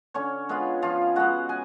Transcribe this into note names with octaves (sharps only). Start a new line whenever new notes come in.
D3 C#4 C#5
G#3 B3 F4
F3 F4 F5
G#3 B3 F#4 F#5
G#5